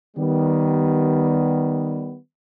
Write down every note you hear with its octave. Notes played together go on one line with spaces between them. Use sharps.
D#3 G3 B3